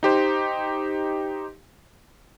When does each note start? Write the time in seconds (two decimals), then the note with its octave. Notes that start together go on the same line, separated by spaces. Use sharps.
0.03 D#4 G4 C5